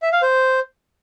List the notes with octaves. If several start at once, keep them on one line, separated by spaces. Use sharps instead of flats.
E5
F5
C5